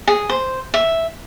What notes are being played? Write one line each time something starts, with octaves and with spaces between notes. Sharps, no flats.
G#4
C5
E5